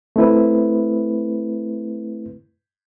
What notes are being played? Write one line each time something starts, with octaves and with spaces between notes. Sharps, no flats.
A3 C4 E4 B4